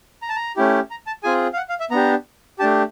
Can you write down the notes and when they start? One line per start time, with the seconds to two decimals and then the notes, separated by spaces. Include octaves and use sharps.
0.22 A#5
0.29 A5
0.36 A#5
0.57 A3 C#4 E4 G4
0.91 A#5
1.07 A5
1.23 C4 F4 G#4 G#5
1.53 F5
1.57 F#5
1.69 F5
1.80 E5
1.91 B3 D4 G4 A#5
2.59 A3 D4 G4 A5